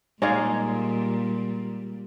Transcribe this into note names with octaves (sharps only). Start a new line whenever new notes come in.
A#2 G3 G#3 D#4 C#5 D5 F5